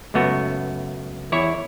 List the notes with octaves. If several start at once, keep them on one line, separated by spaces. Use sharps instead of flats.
C#2 F#2 A3 B3 F#4
E2 E4 C#5